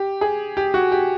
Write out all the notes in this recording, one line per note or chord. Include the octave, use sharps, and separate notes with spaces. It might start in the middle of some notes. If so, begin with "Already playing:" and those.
Already playing: G4
G#4
G4
F#4
G4